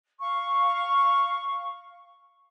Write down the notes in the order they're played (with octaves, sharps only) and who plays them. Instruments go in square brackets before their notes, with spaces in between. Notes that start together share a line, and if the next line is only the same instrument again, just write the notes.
[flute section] F5 C#6